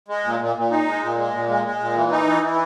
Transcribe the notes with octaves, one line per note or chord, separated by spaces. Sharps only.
G#3
A#2
A#2
A#2
D#4
G#3
A#2
G#3
A#2
G#3
G#3
A#2
E3
D#4
E3
E3